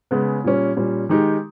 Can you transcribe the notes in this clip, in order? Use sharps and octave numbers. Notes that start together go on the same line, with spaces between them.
C#3 G#3 B3
A#2 G3 C#4
A#2 G3 C#4
D#3 G#3 D#4 G4